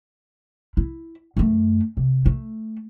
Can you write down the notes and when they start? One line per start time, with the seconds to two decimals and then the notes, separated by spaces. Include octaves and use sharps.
0.77 E4
1.37 F#2 A3
1.97 C3
2.26 A3